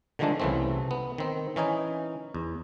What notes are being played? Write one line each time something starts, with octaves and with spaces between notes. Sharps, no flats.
D3 D#3 F3 G#3 A3 D4
C2 C#3 E3 A3 C4
B3
D#3 C4
E3 C#4 D#4 G#5
E2